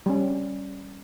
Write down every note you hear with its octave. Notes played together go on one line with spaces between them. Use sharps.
G3 C#4